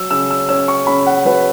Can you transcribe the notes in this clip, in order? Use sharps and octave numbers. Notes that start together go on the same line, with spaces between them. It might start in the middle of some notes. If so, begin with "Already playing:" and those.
Already playing: F#3 E6
C#3 E6
E6
C#4 E6
C#6
C#3 B5
F#5
F#3 B4